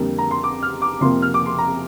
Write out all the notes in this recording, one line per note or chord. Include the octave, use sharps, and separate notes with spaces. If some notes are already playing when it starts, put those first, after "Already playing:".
Already playing: F2 D3 G3 A#3
A#5
C6
D6
F6
D6
F2 C3 F3 A#3 C6
F6
D6
C6
A#5